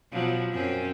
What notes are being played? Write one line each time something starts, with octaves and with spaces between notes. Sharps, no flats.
B2 F3 F#3
F#2 C4 C#4